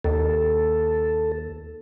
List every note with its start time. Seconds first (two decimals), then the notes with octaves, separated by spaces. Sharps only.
0.04 D#2 A4